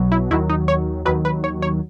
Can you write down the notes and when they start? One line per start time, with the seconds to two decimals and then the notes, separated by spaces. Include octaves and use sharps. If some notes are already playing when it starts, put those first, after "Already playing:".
Already playing: B1 B2 F#3
0.12 E4
0.30 D#2 D#3 F#3 E4
0.50 D#4
0.68 C#5
1.05 D#2 D#3 F#3 B4
1.25 B4
1.44 C#5
1.62 C#5